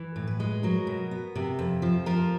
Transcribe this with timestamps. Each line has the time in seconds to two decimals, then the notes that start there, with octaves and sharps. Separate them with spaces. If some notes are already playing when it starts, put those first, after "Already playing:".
Already playing: E3
0.16 A2
0.27 B4
0.40 G#3
0.63 F#3 A#4
0.87 B2
1.11 B3
1.35 C3
1.59 F2
1.82 F3
2.06 F3 A#4